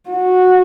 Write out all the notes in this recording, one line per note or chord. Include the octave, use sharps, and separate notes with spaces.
F#4